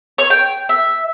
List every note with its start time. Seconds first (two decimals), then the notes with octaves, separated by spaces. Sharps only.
0.18 C#5
0.30 G5
0.69 E5